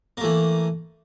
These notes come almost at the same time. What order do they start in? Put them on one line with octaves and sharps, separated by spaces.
A#3 A3 E3